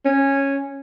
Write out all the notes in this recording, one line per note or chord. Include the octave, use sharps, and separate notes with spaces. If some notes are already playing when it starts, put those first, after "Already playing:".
C#4